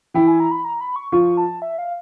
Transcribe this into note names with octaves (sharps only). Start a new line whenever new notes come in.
E3 E4 G5
G#5
A#5
B5
A#5
B5
C#6
F3 F4 C#6
A5
E5
F5